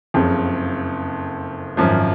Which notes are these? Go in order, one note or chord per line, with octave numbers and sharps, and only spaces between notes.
F#1 F2 C#3
G#1 F#2 F3